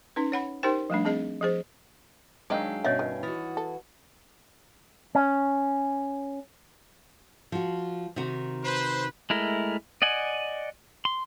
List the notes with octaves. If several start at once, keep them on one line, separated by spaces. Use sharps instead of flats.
C#4 D#4 B4
C#5 F#5 B5
D#4 G4 A#4 C5 G5
F3 G3 A3 D4
C4 G#4 D#5 A5
F3 G#4 C5
D#3 F#3 G#3 D4 D#4 D5 F5 G5
G2 B2 B3 C#4 C#5 D#5 E5
D#3
E3 E4 F#4 D#6
A4
C#4
F3 F#4
C3 D#3 F#4
B4 C5
G#3 A3 E4 A#4
D5 D#5 F#5 G#5
C6